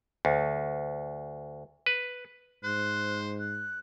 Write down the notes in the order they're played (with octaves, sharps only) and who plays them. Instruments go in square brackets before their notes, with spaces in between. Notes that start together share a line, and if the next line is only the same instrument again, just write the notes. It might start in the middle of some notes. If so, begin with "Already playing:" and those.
[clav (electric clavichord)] D2
B4
[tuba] G#2 [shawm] C5 [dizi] F#6
[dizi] F#6